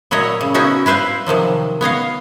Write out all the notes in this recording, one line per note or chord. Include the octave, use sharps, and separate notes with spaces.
A#2 F#3 E4 C#5 D#5
C#3
B3 C#4 D#4 E4 F#4
E4 B4 C5 E5 F5
C3 D#3 F3 F#3
B3 C#5 D#5 F5